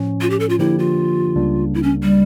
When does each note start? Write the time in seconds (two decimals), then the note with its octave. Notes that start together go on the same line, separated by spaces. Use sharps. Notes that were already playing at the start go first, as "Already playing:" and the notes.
Already playing: A2 F3 C#4
0.21 F4
0.30 G4
0.40 A4
0.49 F4
0.59 D3 F3 A#3 D4 E4 G4
0.79 F4
1.36 C#2 C#3 G3 A#3 D4
1.74 E4
1.83 C#4
2.03 G3